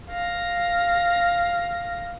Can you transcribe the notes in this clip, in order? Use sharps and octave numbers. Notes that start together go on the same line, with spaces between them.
F5 A#6